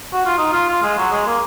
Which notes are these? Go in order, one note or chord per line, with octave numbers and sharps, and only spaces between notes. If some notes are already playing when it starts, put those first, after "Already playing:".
F#4
F4
D#4
F4
F4
G#3
F#3
G#3
A#3